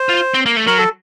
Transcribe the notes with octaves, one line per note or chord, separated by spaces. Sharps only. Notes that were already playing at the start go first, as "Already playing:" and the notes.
Already playing: C5
F4
C4
A#3
A3
F#3 A#4
A4